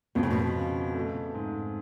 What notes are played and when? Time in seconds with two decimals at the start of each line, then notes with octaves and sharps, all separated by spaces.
0.15 F2 B2
0.23 C#3
0.31 B2
0.56 C#3
0.94 A3
1.34 G#2